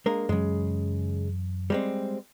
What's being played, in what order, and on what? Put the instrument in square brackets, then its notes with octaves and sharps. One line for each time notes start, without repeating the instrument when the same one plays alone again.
[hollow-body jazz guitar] G#3 A#3 A#4 [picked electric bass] D4
[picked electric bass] F#2 E3 F#3 [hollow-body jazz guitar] C#3 G#3
[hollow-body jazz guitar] G3 G#3 C4